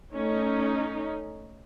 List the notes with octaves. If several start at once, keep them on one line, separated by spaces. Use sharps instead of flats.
A3 C#4 D#4